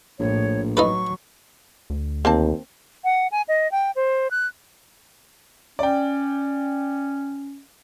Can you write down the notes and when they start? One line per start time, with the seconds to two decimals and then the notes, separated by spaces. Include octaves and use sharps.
0.19 A#1 A2 C#5
0.77 F#3 D#4 A4 B4 C#6
1.90 D2
2.25 D#2 A#3 C4 A5
3.04 F#5
3.32 G#5
3.48 D#5
3.72 G5
3.96 C5
4.31 F#6
5.79 C#4 D5 G5